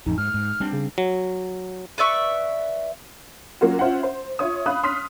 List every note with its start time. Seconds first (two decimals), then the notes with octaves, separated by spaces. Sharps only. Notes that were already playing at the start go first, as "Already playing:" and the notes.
0.06 A1 F2 D#4
0.18 G#2 F6
0.34 G#2
0.60 G3 C4 D4
0.72 C#3
0.98 F#3
1.98 B4 D5 E5 C#6
3.61 F#3 A#3 C#4 F4 F#4
3.79 C#4 F4 C5 E5 F#5
4.03 C5
4.39 F4 C#5 E5 D#6
4.66 F5 B5 D#6 F#6
4.83 C6 D#6 F6 B6